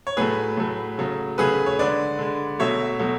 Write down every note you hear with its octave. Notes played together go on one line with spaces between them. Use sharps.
C#5
A2 F#3 A3 G#4 B4
A2 F#3 A3
C#3 F#3 A3
C#3 F#3 A3 G#4 B4
C#5
D3 G#3 B4 D5
D3 G#3
B2 F#3 A3 C#5 E5
B2 F#3 A3